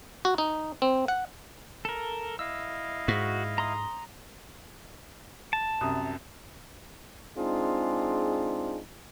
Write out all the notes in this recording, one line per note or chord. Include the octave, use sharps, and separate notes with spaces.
F#4
D#4
C4
F#5
A4 A#4
E4 D#5 F5 E6
G#2 F#4
A#5 C6 D#6
A5
C2 F#2 D#6
G#3 C4 D4 D#4 F4 G#4